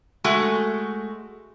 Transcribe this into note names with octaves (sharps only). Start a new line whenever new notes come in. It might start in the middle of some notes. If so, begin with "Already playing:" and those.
G#3 A3 F#4